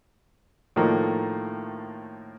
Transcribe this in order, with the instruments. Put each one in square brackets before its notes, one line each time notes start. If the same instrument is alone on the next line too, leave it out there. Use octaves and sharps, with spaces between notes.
[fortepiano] A2 D#3 F3 A3 A#3